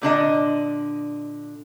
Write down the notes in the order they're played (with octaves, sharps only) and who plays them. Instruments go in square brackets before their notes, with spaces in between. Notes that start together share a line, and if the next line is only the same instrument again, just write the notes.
[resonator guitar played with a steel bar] A#2 D3 D4 D#5